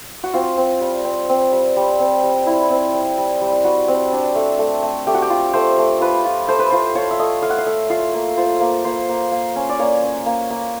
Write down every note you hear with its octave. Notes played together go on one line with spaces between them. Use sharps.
F#4
C4 F4
C4
G3
C4
C4
G3
G3
C4
G3
E4
C4
G3
G3
G3
G3 F#4
C4
D4
A3
A3
A3
A3 G4
F#4
G4
F4
A3 C5
A3
F4 B4
F4
A3 C5
B4
F4 C5
F4 C#5
E5
A3 D#5
A3 F5
F#5
F5
A3 E5
F4 F5
A#3
F4 C5
A#3
A#3 C5
A#3
A#3
C#4
D5
A#3 C#5
C#4
A#3
A#3